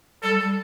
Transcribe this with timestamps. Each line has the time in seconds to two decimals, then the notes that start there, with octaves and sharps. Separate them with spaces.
0.23 G3 A4
0.40 G3